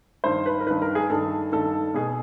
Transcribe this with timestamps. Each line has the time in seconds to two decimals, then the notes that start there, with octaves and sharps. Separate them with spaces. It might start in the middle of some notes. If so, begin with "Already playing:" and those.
0.24 G2 D#3 C5
0.46 B4
0.60 A#4
0.66 G2 D#3 B4
0.82 A#4
0.95 G#4
1.10 G2 D#3 A4
1.52 G2 D#3 A4
1.94 B2 G#4